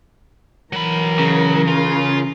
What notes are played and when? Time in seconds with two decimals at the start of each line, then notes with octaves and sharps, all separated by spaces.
0.73 E3 F#3 A#4 B5
1.19 C#3
1.68 F4